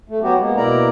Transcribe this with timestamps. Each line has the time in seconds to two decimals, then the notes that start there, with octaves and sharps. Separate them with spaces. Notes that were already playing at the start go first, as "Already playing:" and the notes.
0.09 A3
0.23 F#3 B3 F#4 G4
0.40 G#3 A#3 B3
0.57 B2 A#3 E4 A#4 D5 A#5